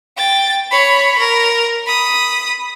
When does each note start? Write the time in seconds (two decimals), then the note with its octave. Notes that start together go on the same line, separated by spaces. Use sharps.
0.17 G5 A6
0.71 C#5 B5
1.18 A#4
1.86 B5 D#6